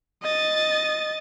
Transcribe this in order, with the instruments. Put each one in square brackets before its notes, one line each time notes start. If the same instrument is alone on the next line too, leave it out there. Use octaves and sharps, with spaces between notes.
[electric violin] D#5 A6